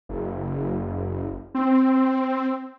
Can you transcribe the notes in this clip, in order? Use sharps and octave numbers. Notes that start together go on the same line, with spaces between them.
F#1
C4